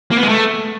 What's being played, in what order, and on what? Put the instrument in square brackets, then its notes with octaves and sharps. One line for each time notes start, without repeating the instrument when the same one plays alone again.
[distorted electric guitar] A#3
B3
G#3
A3